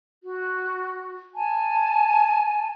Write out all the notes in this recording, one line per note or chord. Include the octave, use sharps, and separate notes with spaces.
F#4
G#5 A5